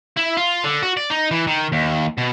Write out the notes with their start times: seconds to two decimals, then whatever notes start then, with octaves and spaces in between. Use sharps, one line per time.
0.17 E4
0.37 F4
0.64 D3
0.83 F#4
0.97 D5
1.10 D#4
1.31 E3
1.47 D#3
1.72 D#2
2.18 B2